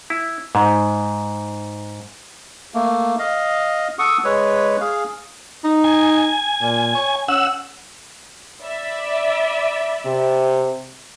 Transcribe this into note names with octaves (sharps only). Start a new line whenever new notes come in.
E4
G#2
A3 A#3
D#5 F5
A4 F#5 C#6 D#6
G#3 B4 C#5
G#4 F5
D#4
G#5
A#2
C#5
C#4 F#5 E6
D5 E5 B5
C3